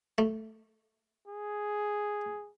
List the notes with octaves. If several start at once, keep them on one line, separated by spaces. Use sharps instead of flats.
A3
G#4